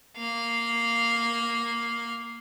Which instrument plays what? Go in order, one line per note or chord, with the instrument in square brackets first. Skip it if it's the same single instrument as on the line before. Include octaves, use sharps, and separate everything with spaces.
[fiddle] A#3 F5